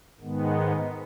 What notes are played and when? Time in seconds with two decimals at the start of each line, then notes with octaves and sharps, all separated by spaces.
0.20 G#2 D#3 G#3 B3